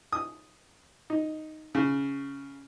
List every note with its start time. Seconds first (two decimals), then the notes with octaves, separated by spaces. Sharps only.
0.12 D#6
1.10 D#4
1.75 C#3